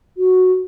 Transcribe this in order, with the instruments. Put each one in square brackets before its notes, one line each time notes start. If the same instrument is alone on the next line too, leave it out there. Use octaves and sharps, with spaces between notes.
[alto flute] F#4